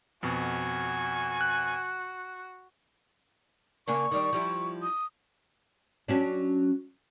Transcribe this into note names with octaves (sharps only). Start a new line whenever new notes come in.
F2 B2 F#4 G#5
F#6
C#3 A#3 D4 C#6
D#3 G3 D4
F3 G3 E4
D#6
F#3 C#4 D4